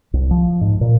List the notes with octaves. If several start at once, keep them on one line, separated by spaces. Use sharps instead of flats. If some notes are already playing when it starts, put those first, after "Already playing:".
C2
F3
G#2
A#2